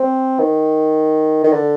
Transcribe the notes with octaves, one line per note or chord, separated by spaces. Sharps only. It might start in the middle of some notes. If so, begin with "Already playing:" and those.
Already playing: C4
D#3
D#3
D3